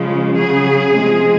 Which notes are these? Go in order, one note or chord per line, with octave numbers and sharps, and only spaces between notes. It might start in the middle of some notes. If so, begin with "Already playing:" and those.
Already playing: C#3 F3 G#3
C#3 F#3 G#4
C3 F3 G#3